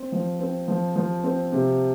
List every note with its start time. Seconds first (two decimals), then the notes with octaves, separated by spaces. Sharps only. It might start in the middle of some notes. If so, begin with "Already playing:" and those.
Already playing: C4
0.12 F3
0.40 C4
0.68 F3
0.96 F3
1.24 C4
1.52 C3